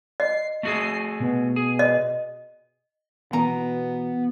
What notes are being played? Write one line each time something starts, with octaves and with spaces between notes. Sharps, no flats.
D#5 C7
A3 F#4 G#4 C7
B2
G#4
D#5
B2 E3 B3 A#5